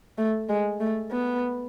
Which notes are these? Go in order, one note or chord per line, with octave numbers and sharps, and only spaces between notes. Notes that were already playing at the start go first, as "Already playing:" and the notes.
A3
G#3
A3
B3